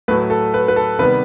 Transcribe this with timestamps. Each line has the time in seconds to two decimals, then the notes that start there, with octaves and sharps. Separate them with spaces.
0.08 A2 F#3 A3 B4
0.30 A4
0.54 B4
0.68 B4
0.76 A4
0.99 C3 D#3 G3 B3 B4